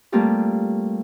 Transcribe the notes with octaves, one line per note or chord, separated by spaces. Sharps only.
G3 A3 A#3 C4 F4 G4